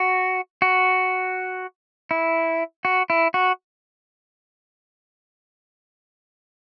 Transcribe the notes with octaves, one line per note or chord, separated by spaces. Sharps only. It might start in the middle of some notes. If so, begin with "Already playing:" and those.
Already playing: F#4
F#4
E4
F#4
E4
F#4